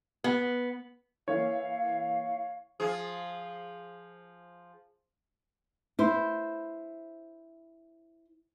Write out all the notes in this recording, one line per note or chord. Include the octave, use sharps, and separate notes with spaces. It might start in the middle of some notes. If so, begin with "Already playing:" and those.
B3
E3 A#3 E4 C#5 F5
F3 G#4
E4 C5